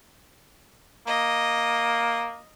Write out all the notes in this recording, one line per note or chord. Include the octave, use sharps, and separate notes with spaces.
A#3 D#5